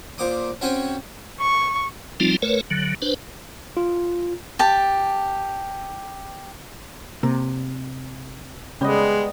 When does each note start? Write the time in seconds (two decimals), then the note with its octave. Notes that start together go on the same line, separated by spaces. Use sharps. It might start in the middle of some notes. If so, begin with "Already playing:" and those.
0.18 A#2 C5 D6 D#6
0.61 C4 C#4 F#4 C5 G5 G#5
1.40 C#6
2.20 F3 G3 C4 D#4 F4
2.42 A3 A#4 B4 C#5
2.70 D3 F#3
3.02 D4 B4 C5
3.77 F4
4.59 G4 A5
7.23 C3 A#3 A#5
8.81 C#3 G3 G#3 B3 C#4 C#5 D#5